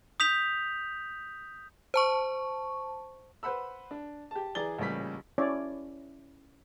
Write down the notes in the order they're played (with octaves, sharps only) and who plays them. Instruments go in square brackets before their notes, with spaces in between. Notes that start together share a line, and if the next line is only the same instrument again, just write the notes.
[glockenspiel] D#6 G6 B6 F7
[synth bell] C5 A5 C#6
[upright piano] B4 C5 F#5 B5 E6
D4
G4 A5
E3 G#4 D5 A#5 A6 G7
A1 A#2 C#3 G3 B6
[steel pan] C#4 E4 C#5 D5